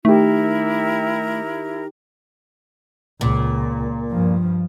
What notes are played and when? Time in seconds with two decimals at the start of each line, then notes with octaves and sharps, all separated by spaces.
0.05 D#3 A3 E4 G4 A#4
3.21 C#2 A#2
4.10 G2 F3